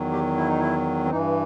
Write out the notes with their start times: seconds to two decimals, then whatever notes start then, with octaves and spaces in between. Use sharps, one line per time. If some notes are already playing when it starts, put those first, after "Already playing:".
Already playing: E2 D#3 F#3
0.12 G4
0.37 E4
0.49 D#4
0.59 E4
1.06 C4
1.10 G2 E3 D#4